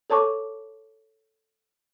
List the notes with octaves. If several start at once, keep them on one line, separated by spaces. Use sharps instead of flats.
A4 C#5 A5 C#6 D6